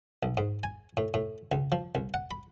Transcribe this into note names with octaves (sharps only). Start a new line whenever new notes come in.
B1
G#2
G#5
A2
A2
C#2
F3
C2
F#5
B5